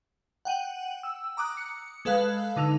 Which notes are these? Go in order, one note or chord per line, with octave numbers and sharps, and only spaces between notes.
F#5 G5 D#7 F#7
E6
A#5 D6 D#6 F#6
C#7
G#3 A4 B4 F5 F#6
D3 D#4 E6 F7